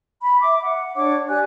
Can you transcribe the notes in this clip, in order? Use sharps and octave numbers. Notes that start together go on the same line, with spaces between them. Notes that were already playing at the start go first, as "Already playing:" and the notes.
B5
E5 D6
F#5
D4 C#5 F#5 D6
G4 D5 G#5 F#6